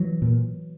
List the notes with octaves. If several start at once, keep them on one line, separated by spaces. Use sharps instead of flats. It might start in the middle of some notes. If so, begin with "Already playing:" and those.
Already playing: E3 F#3
A#2